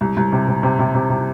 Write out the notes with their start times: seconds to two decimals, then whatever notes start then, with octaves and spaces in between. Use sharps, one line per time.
0.01 C2
0.17 C2
0.32 C3
0.48 C3
0.63 C3
0.79 C3
0.95 C3
1.10 C3